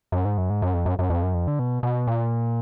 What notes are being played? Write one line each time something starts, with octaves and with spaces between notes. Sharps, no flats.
F#2
G#2
F#2
G#2
F#2
F2
F#2
F#2
F2
F#2
F2
D3
B2
B2
A#2